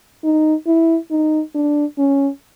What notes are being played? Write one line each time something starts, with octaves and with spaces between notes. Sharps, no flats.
D#4
E4
D#4
D4
C#4